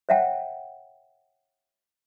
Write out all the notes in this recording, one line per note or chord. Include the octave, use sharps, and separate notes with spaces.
C5 C#5 E5 F#5 G5 A5